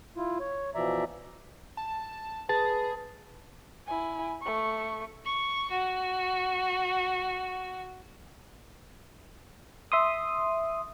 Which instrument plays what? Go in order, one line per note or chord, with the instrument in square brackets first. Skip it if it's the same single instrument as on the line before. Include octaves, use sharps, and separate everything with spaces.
[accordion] E4 F4
C#5
B2 E3 F3 D5 E5 A#5
[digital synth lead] A5
[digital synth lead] G#4 [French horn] B4 [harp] A5
[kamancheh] E4 G#5
A3 C#6
[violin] C#6
F#4
[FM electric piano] E5 C6 D#6